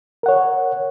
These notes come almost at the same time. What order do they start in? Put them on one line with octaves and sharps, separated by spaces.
A#4 F#5 C#5